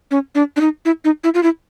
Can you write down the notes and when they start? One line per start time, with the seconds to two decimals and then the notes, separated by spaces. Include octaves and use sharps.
0.11 C#4
0.35 D4
0.56 D4
0.61 D#4
0.85 E4
1.04 D#4
1.24 E4
1.34 F4
1.43 E4